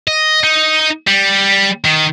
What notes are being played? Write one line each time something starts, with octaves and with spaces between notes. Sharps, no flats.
D#5
D#4
G3
D#3